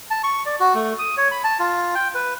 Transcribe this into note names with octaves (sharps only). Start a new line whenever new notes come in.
A5
C#6
D5
F#4
A3
D#6
C#5
B5
A5
F4
G5
B4